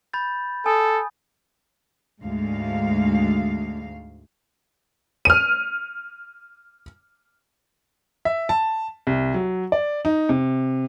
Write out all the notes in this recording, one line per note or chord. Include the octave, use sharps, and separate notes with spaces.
B5 G6 A6
A4 G#5 D#6
D2 G#2 G#3 F5
F6 D#7
E5
A5
C2
F#3
D5
D#4
C3